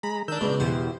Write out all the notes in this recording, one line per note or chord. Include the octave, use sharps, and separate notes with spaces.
G#3 A#5 B5
D#3 D4 A#4 E6 G6
C#2 B2 D5
E2 B2 E4 G4 C5